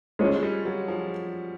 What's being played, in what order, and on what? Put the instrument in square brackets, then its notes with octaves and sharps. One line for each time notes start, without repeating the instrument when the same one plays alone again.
[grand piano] G3 [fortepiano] G#3 C#4 F4
[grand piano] G3
F#3
F3